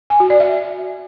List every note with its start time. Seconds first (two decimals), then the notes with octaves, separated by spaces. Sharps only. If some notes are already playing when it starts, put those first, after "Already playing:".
0.10 G#5
0.20 F#4
0.30 D5
0.40 E5